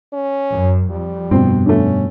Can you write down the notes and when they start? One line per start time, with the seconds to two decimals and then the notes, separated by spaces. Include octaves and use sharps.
0.13 C#4
0.50 F#2
0.90 F2 G3
1.31 G2 B2 C4
1.66 D3 A3 C#4